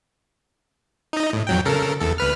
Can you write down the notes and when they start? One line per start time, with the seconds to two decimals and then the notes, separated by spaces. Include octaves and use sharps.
1.13 D#4 D#5
1.33 A2
1.47 F2 F#3 G5
1.65 C#3 A4 A#4
2.00 E2 A4
2.18 D2 B4 F6